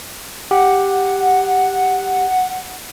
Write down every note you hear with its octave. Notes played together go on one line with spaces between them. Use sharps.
G4 F#5